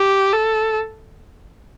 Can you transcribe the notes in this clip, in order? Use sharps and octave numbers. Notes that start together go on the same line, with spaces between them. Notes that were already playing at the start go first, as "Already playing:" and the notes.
Already playing: G4
A4